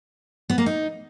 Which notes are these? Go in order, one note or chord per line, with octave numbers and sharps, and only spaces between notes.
B3
A#3
D#4